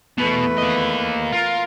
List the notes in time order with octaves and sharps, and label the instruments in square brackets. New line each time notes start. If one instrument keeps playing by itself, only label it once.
[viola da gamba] E2 A3 B4 [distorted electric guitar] B2
[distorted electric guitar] A#3 D#5
[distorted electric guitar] F4 [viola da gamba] A#4